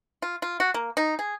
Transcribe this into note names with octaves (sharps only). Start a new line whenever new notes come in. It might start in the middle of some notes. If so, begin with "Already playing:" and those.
F4
F4
F#4
A#3
D#4
G#4